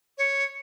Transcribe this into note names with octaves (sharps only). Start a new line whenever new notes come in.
C#5